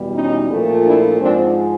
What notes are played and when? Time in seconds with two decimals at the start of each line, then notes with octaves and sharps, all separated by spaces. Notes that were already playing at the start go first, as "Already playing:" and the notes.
Already playing: E2 B2 G3
0.14 C#4 D#4
0.50 A#2 F3 A3
0.85 D4 E4
1.20 G#2 F3 G#3 C4 D4